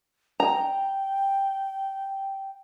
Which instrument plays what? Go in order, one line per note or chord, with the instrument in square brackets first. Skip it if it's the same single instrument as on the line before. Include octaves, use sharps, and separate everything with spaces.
[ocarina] G5 [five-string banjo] A#5